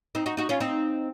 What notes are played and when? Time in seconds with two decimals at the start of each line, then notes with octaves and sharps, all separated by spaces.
0.15 C4 D#4
0.26 D#4 F#4
0.37 D#4 F#4
0.49 C#4 F4
0.60 C4 D#4